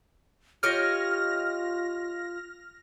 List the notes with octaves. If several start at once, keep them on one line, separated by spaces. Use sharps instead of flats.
F4 G4 C#5 D#5 F6 A#6